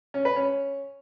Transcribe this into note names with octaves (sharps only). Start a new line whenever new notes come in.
C#4
B4
C#4